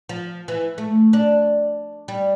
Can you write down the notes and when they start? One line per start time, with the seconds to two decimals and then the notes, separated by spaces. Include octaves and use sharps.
0.09 F3
0.48 E3
0.78 A3
1.13 D4
2.08 G3